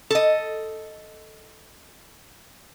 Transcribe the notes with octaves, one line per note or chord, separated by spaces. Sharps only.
A4 D#5